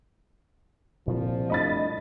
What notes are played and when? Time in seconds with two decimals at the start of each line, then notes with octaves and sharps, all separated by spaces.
1.08 C2 A#2 F3
1.50 A3 D4 D#5 B5 A6